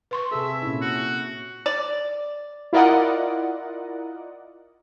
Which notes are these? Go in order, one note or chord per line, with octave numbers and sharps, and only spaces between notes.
B4 C6 C#6
C3 G#4 A4 E5
A#2 C#4 E4
F#4
D5
E4 F4 A#4 D5 D#5 F#5